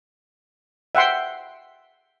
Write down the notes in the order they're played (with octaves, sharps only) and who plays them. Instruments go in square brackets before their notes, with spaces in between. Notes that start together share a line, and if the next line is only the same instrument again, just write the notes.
[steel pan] E5 F#5 G5 C6